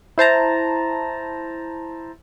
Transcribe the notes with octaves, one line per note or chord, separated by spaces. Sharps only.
E4 C5 A5 A#5